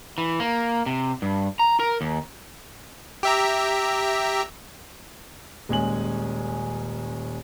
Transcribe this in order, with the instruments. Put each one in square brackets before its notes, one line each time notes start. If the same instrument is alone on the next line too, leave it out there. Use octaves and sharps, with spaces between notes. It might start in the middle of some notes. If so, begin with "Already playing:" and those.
[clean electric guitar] E3
A#3
C3
G2
A#5
A#4
D#2
[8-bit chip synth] G4 E5 A#5
[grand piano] D#1 G#3 C#4 G#5 F#7